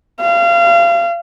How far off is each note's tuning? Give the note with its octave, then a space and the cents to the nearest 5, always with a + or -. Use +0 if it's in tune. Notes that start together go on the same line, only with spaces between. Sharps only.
F5 -30